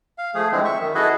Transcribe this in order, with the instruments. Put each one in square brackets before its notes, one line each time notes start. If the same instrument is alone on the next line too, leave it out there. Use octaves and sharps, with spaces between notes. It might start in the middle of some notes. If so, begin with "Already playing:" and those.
[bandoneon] F5
F3 A3 G#4
D3 E3 F3 G#3 C4
E5 C#6
F#2 D#3
E4 F#4 G#4 A4 B4 D#5